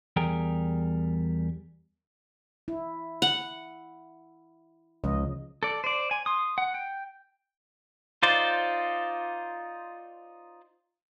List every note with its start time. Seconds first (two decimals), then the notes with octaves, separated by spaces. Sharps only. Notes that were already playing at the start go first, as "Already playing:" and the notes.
0.16 E2 G3 G#4 A#4 G5 G#5
2.68 E4
3.22 F#5
5.04 C#2 C#3 F3 D#5
5.63 A4 D5
5.84 C5 D5
6.11 G#5
6.26 C6 D#6
6.58 F#5
6.74 G5
8.23 D#4 F4 C5 D5